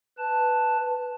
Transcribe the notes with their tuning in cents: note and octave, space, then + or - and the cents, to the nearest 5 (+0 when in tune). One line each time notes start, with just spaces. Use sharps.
B4 +0 A5 +0